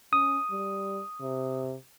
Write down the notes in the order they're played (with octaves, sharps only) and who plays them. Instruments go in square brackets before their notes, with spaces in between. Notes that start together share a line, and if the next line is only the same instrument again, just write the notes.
[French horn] C#4 [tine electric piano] D#6
[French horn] G3
C3